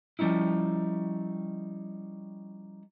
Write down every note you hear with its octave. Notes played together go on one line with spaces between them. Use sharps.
F3 G3 C#4 D#4 E4